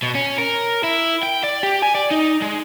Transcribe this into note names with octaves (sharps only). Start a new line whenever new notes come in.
B2
C#4
A#4
E4
G5
D5
G4
G#5
D5
D#4
G#3